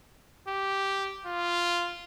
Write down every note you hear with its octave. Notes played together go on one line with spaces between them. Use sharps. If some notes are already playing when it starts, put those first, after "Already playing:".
G4
F4